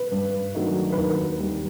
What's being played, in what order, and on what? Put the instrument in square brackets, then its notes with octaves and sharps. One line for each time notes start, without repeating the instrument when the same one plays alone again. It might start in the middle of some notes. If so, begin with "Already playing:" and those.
Already playing: [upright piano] B4
G2
D#3 F#3 A3 D4
B4
D#2 A#4
D#3 G3